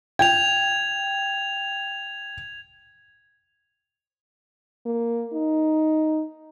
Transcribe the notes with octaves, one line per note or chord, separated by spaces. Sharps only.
G5 G#6 F7
A#3
D#4